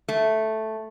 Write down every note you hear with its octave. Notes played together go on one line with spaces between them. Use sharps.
A3